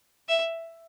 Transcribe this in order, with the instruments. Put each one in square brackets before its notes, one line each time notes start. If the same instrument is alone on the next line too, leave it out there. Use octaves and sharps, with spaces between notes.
[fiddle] E5